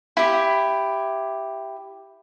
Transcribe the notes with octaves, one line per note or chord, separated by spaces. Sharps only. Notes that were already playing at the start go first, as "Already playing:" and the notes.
E4 G4